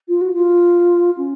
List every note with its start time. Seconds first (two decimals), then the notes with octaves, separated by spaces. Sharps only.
0.08 F4
0.21 F#4
0.34 F4
1.18 C#4